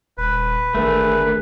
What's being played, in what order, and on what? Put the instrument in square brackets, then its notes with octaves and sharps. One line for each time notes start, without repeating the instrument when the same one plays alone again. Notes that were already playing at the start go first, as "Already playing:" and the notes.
[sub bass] D#1 [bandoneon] B4
[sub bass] G#1 [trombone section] D3 G#4 A#4 [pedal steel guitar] A3